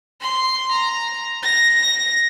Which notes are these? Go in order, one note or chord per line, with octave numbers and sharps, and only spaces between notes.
C6
A#5
A#6